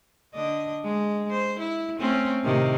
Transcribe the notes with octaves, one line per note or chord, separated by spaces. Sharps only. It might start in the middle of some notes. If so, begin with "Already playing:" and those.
D3 D4 D#5
G#3
C5
E4
A3 C4 C#4
A2 C3 D#3